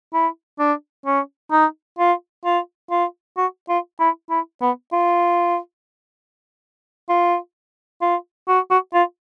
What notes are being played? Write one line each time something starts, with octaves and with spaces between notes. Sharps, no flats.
E4
D4
C#4
D#4
F4
F4
F4
F#4
F4
E4
E4
B3
F4
F4
F4
F#4
F#4
F4